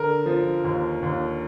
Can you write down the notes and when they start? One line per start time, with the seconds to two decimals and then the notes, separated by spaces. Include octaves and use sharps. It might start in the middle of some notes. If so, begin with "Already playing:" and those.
Already playing: D3 A#4
0.26 F3
0.64 D#2
1.02 D#2